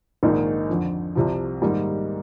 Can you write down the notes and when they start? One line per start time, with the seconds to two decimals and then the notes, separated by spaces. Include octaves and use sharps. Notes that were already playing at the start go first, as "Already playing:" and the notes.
0.23 A#1 G#2 D#3 A#3 D#4
0.69 F2 D3 F3
1.15 C2 C3 F3
1.62 G#2 D#3 G3 A#3